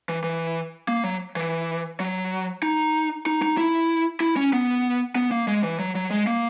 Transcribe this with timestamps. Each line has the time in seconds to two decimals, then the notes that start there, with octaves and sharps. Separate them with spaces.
0.09 E3
0.24 E3
0.88 A#3
1.04 F#3
1.36 E3
2.00 F#3
2.63 D#4
3.26 D#4
3.42 D#4
3.57 E4
4.20 E4
4.37 C#4
4.53 B3
5.15 B3
5.31 A#3
5.48 G#3
5.63 E3
5.79 F#3
5.95 F#3
6.10 G#3
6.27 A#3